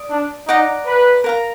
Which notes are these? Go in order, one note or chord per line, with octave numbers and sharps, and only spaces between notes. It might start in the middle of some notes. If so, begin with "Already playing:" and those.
Already playing: D5 D#6
D4
D#4 D5 F#5 A#5 D6
B4
A#4 F5 A#5